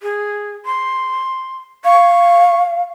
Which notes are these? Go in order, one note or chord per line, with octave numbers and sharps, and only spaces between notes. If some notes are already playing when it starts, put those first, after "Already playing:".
G#4
C6
F5 C#6